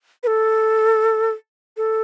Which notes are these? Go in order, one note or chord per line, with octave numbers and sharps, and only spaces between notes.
B4
A4
A4